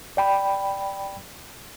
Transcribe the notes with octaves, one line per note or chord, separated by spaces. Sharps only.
D5 G5 B5